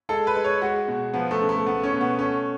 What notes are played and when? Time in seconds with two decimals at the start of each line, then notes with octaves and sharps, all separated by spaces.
0.09 G#3 A4
0.27 B4
0.36 G#3
0.45 C#5
0.62 G#3 F#4
0.88 B2
1.14 F3 B3
1.31 A3
1.41 C#3
1.49 A3
1.66 A3 B3
1.83 C#4
1.92 B2
2.01 B3
2.19 A3 C#4